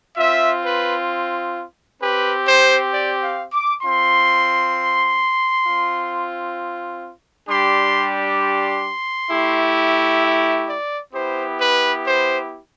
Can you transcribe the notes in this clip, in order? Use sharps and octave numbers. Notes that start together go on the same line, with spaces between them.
C4 F4 E5
B4
C4 G4 B4
C5
D5
F5
D6
C4 F4 C6
C4 F4
G3 D4 G4 C6
C6
A3 E4 G4
E5
D5
B3 E4 G4 C5
B4
C5